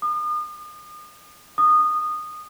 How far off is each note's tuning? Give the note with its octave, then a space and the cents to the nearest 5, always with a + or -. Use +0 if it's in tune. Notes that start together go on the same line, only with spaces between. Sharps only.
D#6 -40
D#6 -20